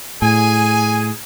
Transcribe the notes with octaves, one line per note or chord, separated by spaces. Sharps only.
A2 G#4 G#5